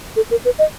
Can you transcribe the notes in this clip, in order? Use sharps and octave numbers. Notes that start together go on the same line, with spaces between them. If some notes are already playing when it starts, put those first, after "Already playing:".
A4
A#4
B4
D#5